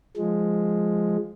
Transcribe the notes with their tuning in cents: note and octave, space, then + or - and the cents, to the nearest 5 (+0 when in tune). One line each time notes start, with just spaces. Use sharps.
F3 +0 G#3 +0